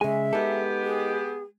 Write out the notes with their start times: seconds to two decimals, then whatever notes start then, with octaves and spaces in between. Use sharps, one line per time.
0.01 C#3 G#3 E5 G#5
0.33 B3 D#4 G4 A4
0.84 G#4